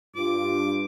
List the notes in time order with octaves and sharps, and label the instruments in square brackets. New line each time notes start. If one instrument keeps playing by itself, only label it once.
[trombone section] G2 [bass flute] F4 [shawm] D6